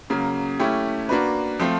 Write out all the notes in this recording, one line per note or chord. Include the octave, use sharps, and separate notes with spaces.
C#3 F#3 A#3
A3 C#4 E4 G4
A#3 D4 F#4 B4
F3 A3 C4 F4